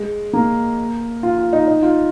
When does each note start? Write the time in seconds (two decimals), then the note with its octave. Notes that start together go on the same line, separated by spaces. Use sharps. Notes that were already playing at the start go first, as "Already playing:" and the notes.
Already playing: G#3
0.33 A#3
1.23 F4
1.38 F4
1.53 D#4
1.67 D#4
1.82 F4